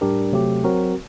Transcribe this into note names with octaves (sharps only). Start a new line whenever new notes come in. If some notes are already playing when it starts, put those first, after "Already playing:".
A2 G3 D4 G4 A#4
C3 F#3 A3 C4 G4
F#3 C4 F#4 A#4